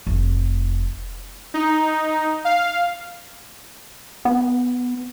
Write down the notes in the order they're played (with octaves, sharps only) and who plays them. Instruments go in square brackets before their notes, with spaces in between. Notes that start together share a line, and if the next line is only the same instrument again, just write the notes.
[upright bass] F1
[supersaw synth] D#4
F5
[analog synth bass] B3